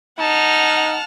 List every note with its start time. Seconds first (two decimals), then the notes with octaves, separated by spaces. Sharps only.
0.19 D#4 F#5 A5 F6